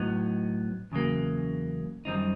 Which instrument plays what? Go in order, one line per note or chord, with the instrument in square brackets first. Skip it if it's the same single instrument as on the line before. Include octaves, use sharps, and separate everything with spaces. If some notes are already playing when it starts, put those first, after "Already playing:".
Already playing: [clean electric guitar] A2 F#3 B3 D#4
E2 C#3 F#3 A#3
F#2 D#3 G3 C4 D#4